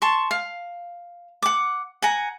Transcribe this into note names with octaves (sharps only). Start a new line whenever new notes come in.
A5 C6 C#6
F5
F#5 D6
F#5 G#5 A#5